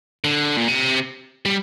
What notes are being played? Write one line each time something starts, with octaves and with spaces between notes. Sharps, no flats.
D3
A#2
C3
G3